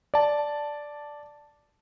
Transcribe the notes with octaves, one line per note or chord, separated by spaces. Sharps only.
D5 A5